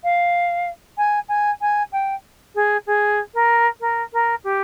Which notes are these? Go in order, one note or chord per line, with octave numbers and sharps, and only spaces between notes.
F5
G#5
G#5
G#5
G5
G#4
G#4
A#4
A#4
A#4
G4